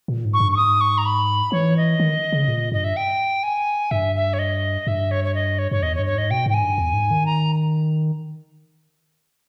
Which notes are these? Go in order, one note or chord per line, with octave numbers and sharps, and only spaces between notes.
A#2
G#2
C#6
G2
C#6
G#2 D#6
C#6
A#5
B5
E3 C#5
D#5
D#3
C#3
A#2
G2 D#5
E5
G5
G#5
G2 E5
E5
C#5
D#5
G2 E5
C#5
C#5
D#5
C#5
G2 C#5
E2 D#5
C#5
G2
C#5
G#2 D#5
B2 G5
G#2 G5
G#5
G2
E2
G#2
D#3
A#5